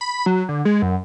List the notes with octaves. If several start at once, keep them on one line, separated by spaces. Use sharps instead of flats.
B5
F#3
D3
G#3
F#2